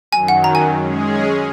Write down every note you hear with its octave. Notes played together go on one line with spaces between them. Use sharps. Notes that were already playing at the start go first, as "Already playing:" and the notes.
F#2 D#3 F#3 G#5
F#5
A#5
G#5
G#3 C#4 G#4